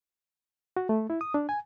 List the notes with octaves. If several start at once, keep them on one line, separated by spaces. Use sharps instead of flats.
F#4
A3
E4
D#6
D4
G#5